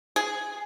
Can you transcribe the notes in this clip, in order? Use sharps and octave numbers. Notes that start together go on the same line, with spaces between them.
G#4